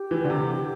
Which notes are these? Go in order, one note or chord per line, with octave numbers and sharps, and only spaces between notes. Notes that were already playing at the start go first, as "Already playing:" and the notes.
Already playing: G4
E3
D3
C3